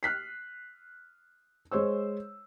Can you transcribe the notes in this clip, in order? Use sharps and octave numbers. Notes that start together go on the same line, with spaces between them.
F6 F#6 B6 C7
G#3 C5 C#5 E6